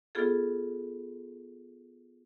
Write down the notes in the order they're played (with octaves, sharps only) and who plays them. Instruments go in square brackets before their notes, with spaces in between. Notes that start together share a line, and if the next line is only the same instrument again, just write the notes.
[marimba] B3 F4 G#4 A4